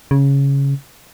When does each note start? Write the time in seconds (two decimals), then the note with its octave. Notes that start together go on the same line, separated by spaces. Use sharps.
0.11 C#3